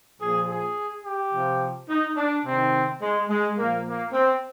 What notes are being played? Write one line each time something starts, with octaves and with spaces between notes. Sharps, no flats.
A#2 F3 G#4
G#4
G4
C3 F3
D#4
D4
C3 D#3 C4
G#3
G#3
A#2 F3 A#3
A#3
C4